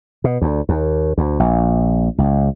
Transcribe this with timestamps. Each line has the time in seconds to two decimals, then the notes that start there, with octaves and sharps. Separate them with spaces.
0.24 B2
0.41 D2
0.69 D#2
1.18 D2
1.40 A#1
2.18 C#2